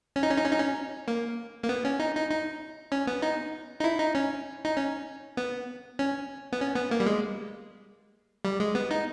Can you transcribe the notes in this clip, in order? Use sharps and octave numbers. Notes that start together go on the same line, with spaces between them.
C#4
D#4
C#4
D#4
C#4
D#4
C#4
A#3
A#3
B3
C#4
D#4
D#4
D#4
C#4
B3
D#4
D#4
E4
D#4
C#4
D#4
C#4
B3
C#4
B3
C#4
B3
A#3
G3
G#3
G3
G#3
B3
D#4